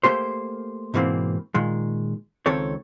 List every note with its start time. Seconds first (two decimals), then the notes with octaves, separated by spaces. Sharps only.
0.03 A3 A#3 G4 C5
0.94 G#2 B2 E3 A#3 C4
1.54 A#2 D#3 G#3
2.46 C#2 D#3 C4 A4 C#5